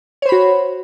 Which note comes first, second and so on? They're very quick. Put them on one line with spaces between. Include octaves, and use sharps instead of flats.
C#5 C5 B5 F#4